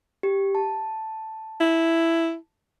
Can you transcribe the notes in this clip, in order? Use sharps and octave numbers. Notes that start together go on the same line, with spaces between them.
G4
A5
E4